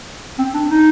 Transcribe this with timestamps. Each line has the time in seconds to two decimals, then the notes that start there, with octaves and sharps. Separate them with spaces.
0.38 C4
0.54 D4
0.70 D#4